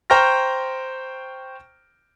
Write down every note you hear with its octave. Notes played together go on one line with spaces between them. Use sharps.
C5 G5 A#5 C#6 F6 A#6